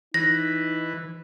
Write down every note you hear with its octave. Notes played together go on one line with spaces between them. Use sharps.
E3 D#4 B4 A#6